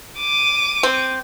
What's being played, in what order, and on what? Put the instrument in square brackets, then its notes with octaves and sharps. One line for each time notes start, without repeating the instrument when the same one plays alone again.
[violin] D6 D#7
[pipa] C4